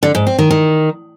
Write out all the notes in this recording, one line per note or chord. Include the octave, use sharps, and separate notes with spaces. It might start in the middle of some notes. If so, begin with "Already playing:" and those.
D3
G#2
C4
D#3
D#3